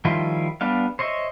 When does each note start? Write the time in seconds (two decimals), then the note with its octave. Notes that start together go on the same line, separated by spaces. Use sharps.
0.05 D#3 F3 G3 E4 F4
0.61 G3 B3 D4 F5
0.99 C5 C#5 D#5 E5